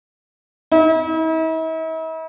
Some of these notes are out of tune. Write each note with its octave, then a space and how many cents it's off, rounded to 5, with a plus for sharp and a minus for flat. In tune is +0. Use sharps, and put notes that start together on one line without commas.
E4 -45